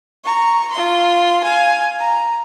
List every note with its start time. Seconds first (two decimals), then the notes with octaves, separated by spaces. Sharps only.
0.24 A#5 C#6
0.71 F4 C6
1.44 F5 G#5
2.00 A#5